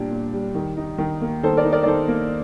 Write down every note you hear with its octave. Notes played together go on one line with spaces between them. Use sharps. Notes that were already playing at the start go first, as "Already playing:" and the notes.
Already playing: A#2 G3 D4 G4
A#2
G3
D#3
D#4
D#3
A#3
D#3 A4 C5
A#4 D5
D#4
A#4 D5
D5
D#3 A4 C5
A#3